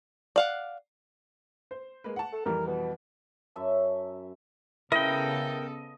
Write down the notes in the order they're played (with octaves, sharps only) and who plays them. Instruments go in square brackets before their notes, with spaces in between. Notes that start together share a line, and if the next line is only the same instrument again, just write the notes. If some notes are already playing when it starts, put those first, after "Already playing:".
[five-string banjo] D5 F5 F#5
[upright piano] C5
G#3 A#3 B4
F#5 A5
[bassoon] A4
[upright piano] F2 E3 G3 [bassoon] A#4
[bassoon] B2
[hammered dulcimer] F#2 E5 A5
[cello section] C#3 B3 A4 [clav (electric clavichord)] E4 [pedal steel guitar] A#4 G5 [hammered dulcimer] D#5